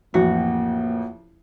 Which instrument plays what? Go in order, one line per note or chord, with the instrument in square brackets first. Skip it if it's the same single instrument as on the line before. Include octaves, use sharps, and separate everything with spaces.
[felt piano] A1 F2 [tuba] A#3 [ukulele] F#4